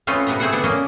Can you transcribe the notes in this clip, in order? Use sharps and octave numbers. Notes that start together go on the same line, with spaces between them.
A3 C4 C#4 F4 B4 D#5
C3 B3 B4 D#5 A#5
A3 C4 G#4 C5 F#5
D3 B3 D4 F#5
A#3 C#4 D4 D#5